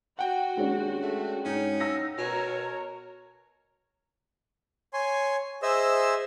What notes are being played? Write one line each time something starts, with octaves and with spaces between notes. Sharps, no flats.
F#4 F#5 G5
D#2 G#3 C#4 D4
A3
G#2 C#4 D#4
E6 A#6
B2 A#4 C#5 A#5
C#5 G#5 C6
G#4 C5 D#5 E5 E6